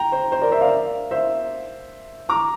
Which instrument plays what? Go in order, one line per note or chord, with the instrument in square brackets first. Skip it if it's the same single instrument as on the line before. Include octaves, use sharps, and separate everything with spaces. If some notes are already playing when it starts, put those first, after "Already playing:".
Already playing: [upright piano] G5 A#5
C5
C5
A#4 D5
C5 E5
D5 F5
C5 E5
A#5 D6